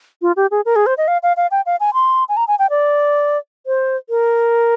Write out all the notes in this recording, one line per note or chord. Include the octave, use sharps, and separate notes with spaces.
F4
G4
G#4
A#4
G#4
C5
D#5
F5
F5
F5
G5
F5
G#5
C6
G#5
A#5
G#5
G5
D5
C5
A#4